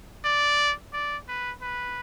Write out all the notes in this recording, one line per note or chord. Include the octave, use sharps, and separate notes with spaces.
D5
D5
B4
B4